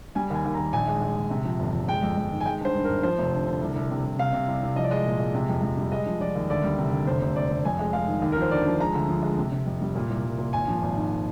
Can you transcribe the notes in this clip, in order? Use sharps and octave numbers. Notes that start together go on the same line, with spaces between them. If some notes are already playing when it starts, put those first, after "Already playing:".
G3 G#5
D#2 G#5
D#2
A#5
D#2
A#1 G#5
G#3
G#3
A#1
C3
F3
G1
G1
G#3 G5
F2
F2
D#3
G#5
G#3 G5
G2 C5
G2
A#4
G#1
F3 C5
F1
D3
D3
C2
C2
C3
C2
C3 F5
C3
C2
C2
F3 D#5
D5
G#3 D#5
A#2
G#3
C3
F2
F2
G3
G#3 D#5
F3
F3 D5
D#2
D2 D5
G3
C3
D2
F1 C5
F1
F1 D5
F1
F2 G#5
G#3
G#3 F5
D#3
D#2
F3 A#4
C5
D3 D5
F3
G#3 A#5
D2
F3
G#3
C3
C3
F2
G3
A#2
C2
C2
A#2
G#1 G#5
F3
G#1
G#2